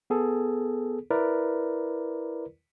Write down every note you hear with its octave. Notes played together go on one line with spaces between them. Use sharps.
B3 G#4 A4
E4 A#4 B4 D5